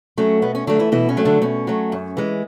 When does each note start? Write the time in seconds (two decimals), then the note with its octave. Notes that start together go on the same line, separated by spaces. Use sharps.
0.18 F#3 A3 C#4
0.42 B2 B3
0.55 C#4
0.67 D3 F#3 A3 D4
0.79 E3 E4
0.92 B2 E3 E4
1.09 C#4
1.17 F#3 A3
1.25 D3 D4
1.42 B2 C#4
1.67 F#3 A3
1.92 F#2
2.17 E3 G#3